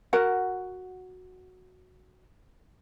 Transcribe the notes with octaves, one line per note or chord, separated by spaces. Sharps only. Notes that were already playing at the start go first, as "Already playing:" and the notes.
F#4 A#4 F#5